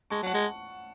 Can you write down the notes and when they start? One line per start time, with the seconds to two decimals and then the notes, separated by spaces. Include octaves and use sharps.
0.10 G#3 A5 C#6
0.23 F#3 F#5 A5
0.34 G#3